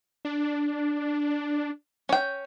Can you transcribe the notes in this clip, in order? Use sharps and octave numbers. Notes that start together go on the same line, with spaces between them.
D4
C#4 G5